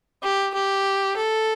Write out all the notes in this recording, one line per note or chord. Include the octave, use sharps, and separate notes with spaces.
G4
G4
A4